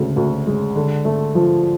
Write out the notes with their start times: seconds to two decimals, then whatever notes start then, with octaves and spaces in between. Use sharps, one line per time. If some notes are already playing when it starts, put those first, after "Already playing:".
Already playing: D2 C#3 G#3
0.16 D2
0.47 G#3
0.76 D3
1.05 A3
1.35 F3